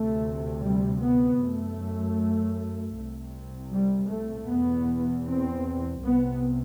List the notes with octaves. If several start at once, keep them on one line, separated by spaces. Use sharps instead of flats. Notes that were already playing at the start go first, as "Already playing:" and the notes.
Already playing: D2 C3 A3
G3
B3
F#2 A3
C2 C3
G3
A3
E2 B2 B3
C4
C2 C3 B3